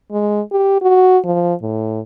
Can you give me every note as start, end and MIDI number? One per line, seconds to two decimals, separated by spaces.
0.12 0.41 56
0.52 0.78 67
0.82 1.18 66
1.25 1.54 53
1.62 2.00 45